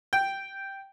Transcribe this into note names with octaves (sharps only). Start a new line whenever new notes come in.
G5